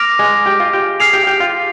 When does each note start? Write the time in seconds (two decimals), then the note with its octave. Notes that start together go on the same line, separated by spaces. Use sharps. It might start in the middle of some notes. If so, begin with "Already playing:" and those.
Already playing: D6 F6 A#6 D7 F7
0.19 G#3
0.46 G4
0.60 F4
0.73 G4
1.00 G#4 F6 C7 F7
1.13 G4
1.27 G4
1.40 F4